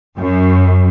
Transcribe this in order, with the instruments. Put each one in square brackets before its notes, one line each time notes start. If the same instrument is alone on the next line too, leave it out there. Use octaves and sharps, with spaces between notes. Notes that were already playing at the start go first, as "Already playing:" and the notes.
[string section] F#2